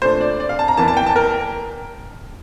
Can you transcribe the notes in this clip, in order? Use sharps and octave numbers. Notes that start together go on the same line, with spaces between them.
A#2 A3 D4 C5
D5
D5
F5
A5
A#5
E2 E3 A#3 A5
A5
G5
A5
A#4